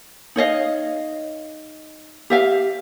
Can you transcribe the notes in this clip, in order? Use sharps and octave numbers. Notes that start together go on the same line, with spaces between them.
D#4 C#5 D#5 F5
G4 E5 F5